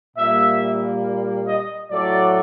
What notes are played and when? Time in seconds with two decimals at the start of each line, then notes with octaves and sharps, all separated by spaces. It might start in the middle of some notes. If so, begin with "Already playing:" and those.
0.17 A#2 G3 A#3 E5
1.47 D#5
1.91 A2 F#3 A3 D5